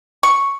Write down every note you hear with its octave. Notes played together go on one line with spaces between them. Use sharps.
C#6